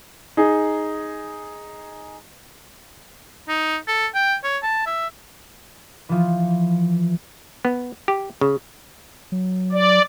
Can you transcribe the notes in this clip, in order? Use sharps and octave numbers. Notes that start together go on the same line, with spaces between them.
D#4 G#4
D#4
A4
G5
C#5
A5
E5
E3 F3
B3
G4
C#3
F#3
D5